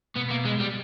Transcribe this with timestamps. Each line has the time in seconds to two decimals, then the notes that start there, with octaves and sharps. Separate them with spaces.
0.16 B2 B3
0.31 A#3
0.46 G#3
0.60 G3